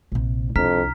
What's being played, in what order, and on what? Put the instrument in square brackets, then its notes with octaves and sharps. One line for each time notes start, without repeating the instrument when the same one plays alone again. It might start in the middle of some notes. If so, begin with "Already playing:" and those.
[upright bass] A#1 C3
[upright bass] C2 D4 [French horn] F2 [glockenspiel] A#5 F6 B6